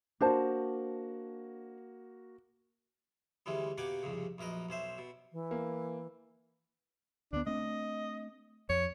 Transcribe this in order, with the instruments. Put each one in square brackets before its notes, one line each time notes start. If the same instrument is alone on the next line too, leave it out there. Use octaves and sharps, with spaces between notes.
[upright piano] A#3 F#4 [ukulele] D4 C5 A5
[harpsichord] D2 E3 G3 G#3 C#4
B2 A#3 G4 F#5 G#5 D6
C2 F2 G#2 C#3
A#1 F#2 A#4 B4 D#5
B1 C#4 C5 E5
B2
[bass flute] E3
[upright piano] A#3
[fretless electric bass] D2 B3 [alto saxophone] D4
[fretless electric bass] A3 C4 D4 [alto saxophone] D#5
[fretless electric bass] F2 [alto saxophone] C#5